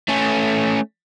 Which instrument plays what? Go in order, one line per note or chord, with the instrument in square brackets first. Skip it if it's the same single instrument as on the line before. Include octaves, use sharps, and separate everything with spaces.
[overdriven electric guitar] A3 C#4